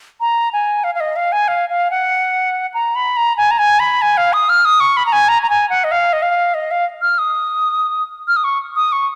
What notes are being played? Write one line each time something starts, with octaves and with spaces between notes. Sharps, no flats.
A#5
G#5
F5
F5
D#5
F5
G#5
F5
F5
F#5
A#5
B5
A#5
G#5
A#5
G#5
B5
G#5
F5
D#6
F6
D#6
C#6
B5
A#5
G#5
A#5
A#5
G#5
F#5
D#5
F5
D#5
F5
D#5
F5
F6
D#6
F6
D#6
C#6
D#6
C#6